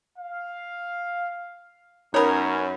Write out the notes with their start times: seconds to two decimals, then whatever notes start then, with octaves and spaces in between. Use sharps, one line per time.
0.18 F5
2.14 F#2 B3 C#4 D#4 A#4 C#5 B5